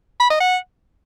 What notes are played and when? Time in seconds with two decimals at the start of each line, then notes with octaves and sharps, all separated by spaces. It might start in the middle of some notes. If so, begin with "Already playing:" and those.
0.20 B5
0.31 D#5
0.41 F#5